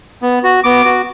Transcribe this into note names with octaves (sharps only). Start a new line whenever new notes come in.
B3
F#4
B3 D6
F#4